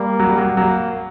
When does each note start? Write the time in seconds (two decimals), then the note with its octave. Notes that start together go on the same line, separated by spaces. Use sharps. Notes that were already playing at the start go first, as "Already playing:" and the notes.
Already playing: G3 A#3
0.19 F#3
0.29 G3
0.38 F#3
0.56 F#3 A#3